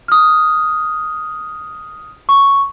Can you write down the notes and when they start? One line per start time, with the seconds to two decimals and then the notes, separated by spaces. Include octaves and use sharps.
0.08 D#6 F6
2.29 C#6